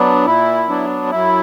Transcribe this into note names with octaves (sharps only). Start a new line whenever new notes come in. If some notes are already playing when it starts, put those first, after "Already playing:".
Already playing: F#3 B3 D4
A#2 E4
F#3 B3 D4
F#2 E4